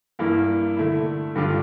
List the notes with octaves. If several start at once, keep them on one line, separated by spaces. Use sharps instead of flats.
G2 E3 A#3 E4
D3 A3 E4
G2 D3 G3 D4 F4